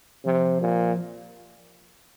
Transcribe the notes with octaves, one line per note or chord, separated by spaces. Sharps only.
C3 F3
A#2